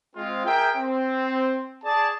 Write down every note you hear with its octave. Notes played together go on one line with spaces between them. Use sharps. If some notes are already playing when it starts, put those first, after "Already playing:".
G#3 C4 F4
G#4 A#4 E5 G5
C4
G#4 D5 A5